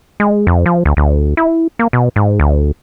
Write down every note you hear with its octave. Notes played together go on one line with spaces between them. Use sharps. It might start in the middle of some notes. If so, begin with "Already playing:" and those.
G#3
F2
F3
D2
D2
E4
A#3
B2
G#2
D2